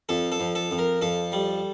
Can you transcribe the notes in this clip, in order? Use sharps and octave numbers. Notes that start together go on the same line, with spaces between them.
F2 A4
A4
F2
A4
F2
A#4
F2 A4
G3